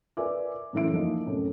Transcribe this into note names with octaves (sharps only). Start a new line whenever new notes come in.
A#4 B4 D5 E5 G#5 D6
F#2 A2 E3 E4 E5 D7
F3 A#3 D#4 F4 D#5
F#2 A2 C3